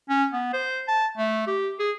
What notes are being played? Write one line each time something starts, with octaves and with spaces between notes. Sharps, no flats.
C#4
B3
C5
A5
A3
G4
G#4